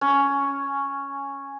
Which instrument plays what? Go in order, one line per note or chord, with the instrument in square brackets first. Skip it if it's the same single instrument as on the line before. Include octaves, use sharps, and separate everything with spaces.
[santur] C#4